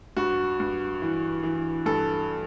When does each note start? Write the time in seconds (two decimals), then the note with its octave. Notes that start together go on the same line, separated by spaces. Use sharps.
0.16 G2 F#4
0.60 G2
1.02 E3
1.43 E3
1.86 G2 A4